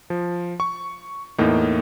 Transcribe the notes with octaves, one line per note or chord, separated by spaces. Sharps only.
F3
C#6
E2 A2 A#3 D#4